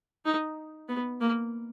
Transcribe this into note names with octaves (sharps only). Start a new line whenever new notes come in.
D#4
B3
A#3